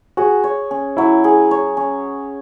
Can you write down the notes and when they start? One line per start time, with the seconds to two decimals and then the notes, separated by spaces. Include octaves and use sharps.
0.17 F#4 G#4
0.44 C#5
0.71 C#4
0.97 F#3 E4
1.24 G#4
1.51 C#5
1.77 C#4